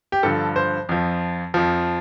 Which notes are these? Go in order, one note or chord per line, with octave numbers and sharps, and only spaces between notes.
G4
G2 D3 F3 A4
C5
F2 F3
F2 F3